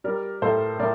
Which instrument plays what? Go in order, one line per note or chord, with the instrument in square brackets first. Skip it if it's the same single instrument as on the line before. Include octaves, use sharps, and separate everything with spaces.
[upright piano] G3 A#4 D5
A2 A4 C5
A2 A#4 D5